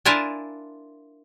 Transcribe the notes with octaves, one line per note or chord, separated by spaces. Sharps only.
D4 E4 F4 A#4 G#5 A5